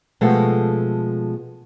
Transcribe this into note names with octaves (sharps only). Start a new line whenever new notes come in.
B2 F3 G#3 A3 G4 A4